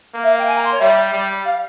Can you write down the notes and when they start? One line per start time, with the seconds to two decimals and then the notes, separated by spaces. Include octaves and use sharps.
0.14 A#3
0.23 E5
0.32 F5
0.39 G5
0.47 G#5
0.56 A#5
0.64 C6
0.72 C#5
0.80 G3 E5
1.13 G3
1.45 F5